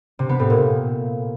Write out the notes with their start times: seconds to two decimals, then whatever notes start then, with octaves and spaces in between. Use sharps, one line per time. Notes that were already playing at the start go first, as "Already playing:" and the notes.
0.19 C3
0.29 B3
0.40 A2
0.50 A#2